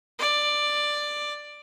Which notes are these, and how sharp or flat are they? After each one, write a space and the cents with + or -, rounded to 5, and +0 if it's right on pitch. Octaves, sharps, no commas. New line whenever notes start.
D5 +10